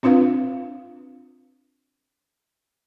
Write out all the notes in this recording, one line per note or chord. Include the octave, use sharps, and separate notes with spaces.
C4 D4 F4 B4 F5